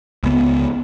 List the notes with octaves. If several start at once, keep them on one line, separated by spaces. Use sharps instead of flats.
C#2 B3